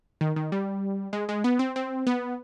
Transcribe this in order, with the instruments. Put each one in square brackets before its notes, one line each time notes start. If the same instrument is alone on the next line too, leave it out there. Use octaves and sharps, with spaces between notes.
[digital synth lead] D#3
D#3
G3
G#3
G#3
B3
C4
C4
B3